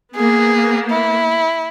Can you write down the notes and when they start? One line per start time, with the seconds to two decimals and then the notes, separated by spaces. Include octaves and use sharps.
0.16 A#3 B3 G#4
0.90 E4